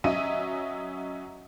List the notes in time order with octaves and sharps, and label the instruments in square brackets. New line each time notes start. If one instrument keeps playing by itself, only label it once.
[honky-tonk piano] F#3 C#4 D#5 E5 D#7